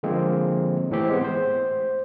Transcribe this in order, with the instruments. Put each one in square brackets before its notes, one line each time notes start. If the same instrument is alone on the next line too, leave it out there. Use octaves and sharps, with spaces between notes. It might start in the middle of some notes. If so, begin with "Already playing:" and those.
[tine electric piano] D3 F3 G#3 A#3 C4
A2 E3 C4 G4
G#3 B3
C5